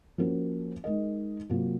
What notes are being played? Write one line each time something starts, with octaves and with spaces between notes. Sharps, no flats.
F3 A#3 C#4 F#4 A#4
G#3 D#4 A#4 D#5
C3 F#3 A#3 F4